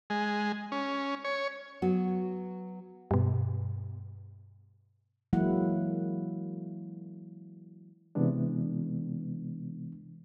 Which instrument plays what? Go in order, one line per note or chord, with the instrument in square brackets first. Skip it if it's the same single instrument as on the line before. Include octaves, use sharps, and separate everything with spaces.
[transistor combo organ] G#3
C#4
C#5
[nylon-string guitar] F#3 B3 F#4
[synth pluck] G2 B2
[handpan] E3 F#3 G#3 A#3 E4 F#5
[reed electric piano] C3 E3 G#3 B3 D4